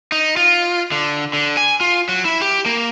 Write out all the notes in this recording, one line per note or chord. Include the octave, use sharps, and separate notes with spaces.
D#4
F4
D3
D3
G#5
F4
F#3
E4
G4
A#3